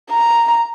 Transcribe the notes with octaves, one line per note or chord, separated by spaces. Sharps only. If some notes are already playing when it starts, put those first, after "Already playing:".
A#5